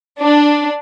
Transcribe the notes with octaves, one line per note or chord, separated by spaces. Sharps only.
D4